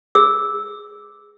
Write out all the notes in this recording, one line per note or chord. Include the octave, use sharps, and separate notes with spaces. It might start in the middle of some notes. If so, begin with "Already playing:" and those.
G#4 E6